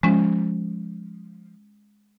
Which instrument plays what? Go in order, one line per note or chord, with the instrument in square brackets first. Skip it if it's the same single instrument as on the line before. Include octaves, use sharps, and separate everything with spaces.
[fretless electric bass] F3 [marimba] G#3 C#4